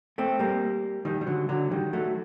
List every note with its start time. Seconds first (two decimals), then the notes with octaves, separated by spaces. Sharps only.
0.18 A3 C4
0.39 G3 A#3
1.05 D#3 G3
1.21 G3
1.27 D3 F#3
1.49 D3 F#3
1.71 D#3 G3
1.93 F#3 A3